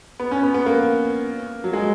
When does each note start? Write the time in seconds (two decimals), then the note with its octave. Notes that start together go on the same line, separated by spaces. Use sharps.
0.20 B3
0.31 C#4
0.43 B3
0.54 B3
0.66 A#3
1.64 F#3
1.73 G#3